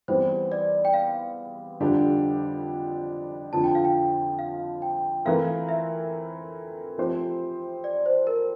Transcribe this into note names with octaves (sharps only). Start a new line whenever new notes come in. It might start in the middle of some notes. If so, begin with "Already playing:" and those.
E2 E3 G3 C4 C5
D5
G5
F5
F2 D3 G3 D4 G4
F2 D3 F3 A5
G5
F5
G5
F5
G5
E3 A3 C4 E4 A#4 F5
E5
F3 A3 C4 G4 C5
D5
C5
A#4